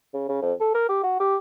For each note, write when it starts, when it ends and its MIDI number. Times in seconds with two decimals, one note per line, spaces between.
0.14 0.24 49
0.29 0.41 49
0.42 0.53 41
0.60 0.71 69
0.74 0.89 70
0.89 0.99 67
1.04 1.18 66
1.20 1.36 67